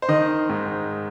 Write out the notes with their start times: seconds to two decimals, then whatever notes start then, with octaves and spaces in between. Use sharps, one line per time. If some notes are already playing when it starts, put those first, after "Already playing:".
0.02 C5
0.08 D#3 D#5
0.49 G#2